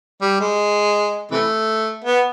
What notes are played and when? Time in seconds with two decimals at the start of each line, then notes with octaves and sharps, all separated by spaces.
0.21 G3
0.40 G#3
1.31 C3 E3 A3
2.04 B3